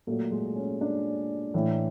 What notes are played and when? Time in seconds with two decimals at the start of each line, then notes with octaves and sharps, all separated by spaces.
0.07 A#2 F#3 A3
0.31 G#3
0.56 C#4
0.81 D4
1.54 A2 E3